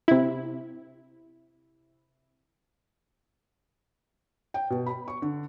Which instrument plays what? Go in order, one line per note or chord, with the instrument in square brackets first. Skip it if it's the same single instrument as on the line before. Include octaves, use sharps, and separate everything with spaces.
[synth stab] C3 E4
[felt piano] G5
B2
B5
C#6
D3